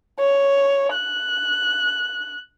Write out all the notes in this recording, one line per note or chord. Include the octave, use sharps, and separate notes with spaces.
C#5
F#6